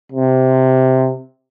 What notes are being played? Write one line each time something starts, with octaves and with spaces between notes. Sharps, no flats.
C3